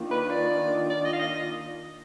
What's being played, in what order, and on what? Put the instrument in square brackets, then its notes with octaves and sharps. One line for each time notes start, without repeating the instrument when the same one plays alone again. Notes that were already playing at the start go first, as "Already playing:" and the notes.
Already playing: [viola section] D#3 A#3 D4 F4
[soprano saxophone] B4
D5
D5
D#5
F5
D#5
D#5